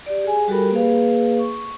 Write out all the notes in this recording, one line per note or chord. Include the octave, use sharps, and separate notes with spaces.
G4 D5
G#4 G#5
G3 F#4 G4 A4 A#4 B5
A#3 G#4 B4 F5
C#6